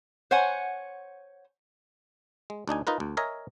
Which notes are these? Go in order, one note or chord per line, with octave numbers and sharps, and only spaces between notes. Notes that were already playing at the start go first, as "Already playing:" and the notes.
C5 C#5 F#5 G#5
G#3
D2 D4 D#4 G#5
D#4 F4 A#4 B4
D2
A#4 C#5 D#5 E5 G#5 A#5